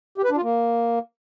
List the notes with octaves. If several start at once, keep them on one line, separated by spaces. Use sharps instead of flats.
G4
B4
D4
F4
A#3